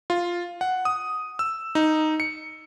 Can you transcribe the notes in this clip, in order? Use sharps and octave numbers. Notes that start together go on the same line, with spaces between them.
F4
F#5
D#6
E6
D#4
C#7